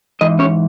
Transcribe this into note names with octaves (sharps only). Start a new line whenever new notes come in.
G#2 E3 D#5
C#4 C#5